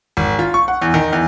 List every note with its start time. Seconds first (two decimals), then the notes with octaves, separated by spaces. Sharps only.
0.17 G#1
0.39 F4
0.54 C#6
0.68 F#5
0.82 E2
0.94 D#3
1.13 E2